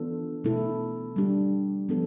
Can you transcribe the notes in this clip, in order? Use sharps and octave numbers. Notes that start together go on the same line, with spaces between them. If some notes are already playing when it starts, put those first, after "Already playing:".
Already playing: E3 B3 D4 F4 A4
B2 A3 E4 A4
G3 D4 G4
F3 B3 D4 A4